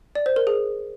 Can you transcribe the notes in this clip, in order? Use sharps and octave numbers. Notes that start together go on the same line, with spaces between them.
D5
C5
A#4
G#4